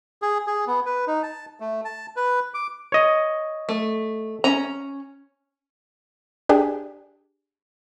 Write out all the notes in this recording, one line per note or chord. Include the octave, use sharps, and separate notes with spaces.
G#4
G#4
B3
B4
D#4
A5
A3
A5
B4
D6
C#5 D#5
A3
C#4 A#5
D4 G4 G#4